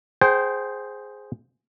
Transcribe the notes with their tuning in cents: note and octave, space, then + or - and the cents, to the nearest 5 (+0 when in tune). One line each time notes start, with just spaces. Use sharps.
G#4 +0 C5 +0 G5 -25